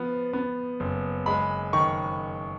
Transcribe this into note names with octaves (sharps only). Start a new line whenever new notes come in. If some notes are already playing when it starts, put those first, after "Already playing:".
Already playing: F3 B3
B3
F#1
G#3 B5
D#3 C#6